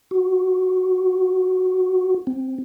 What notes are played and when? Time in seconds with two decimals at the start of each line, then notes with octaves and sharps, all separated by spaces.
0.11 F#4
2.27 C4